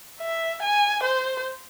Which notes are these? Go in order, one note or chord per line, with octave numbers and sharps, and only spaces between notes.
E5
G#5
C5